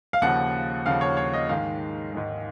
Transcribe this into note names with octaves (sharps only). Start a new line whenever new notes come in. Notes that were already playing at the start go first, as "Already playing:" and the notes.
F5
D#2 C#3 F3 F#5
D#2 C#3 F3 F5
C#5
C#5
D#5
G#2 D#3 G#3 F5
G#2 D#3 G#3